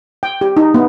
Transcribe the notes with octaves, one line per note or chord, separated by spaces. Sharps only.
G5
G4
D#4
B3